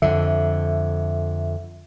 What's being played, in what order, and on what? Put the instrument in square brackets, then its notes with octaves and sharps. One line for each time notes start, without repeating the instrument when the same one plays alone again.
[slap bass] F2 D3 [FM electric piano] E5